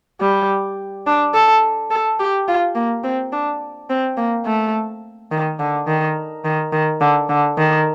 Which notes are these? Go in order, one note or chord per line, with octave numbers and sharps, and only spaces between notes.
G3
D4
A4
A4
G4
F4
A#3
C4
D4
C4
A#3
A3
D#3
D3
D#3
D#3
D#3
D3
D3
D#3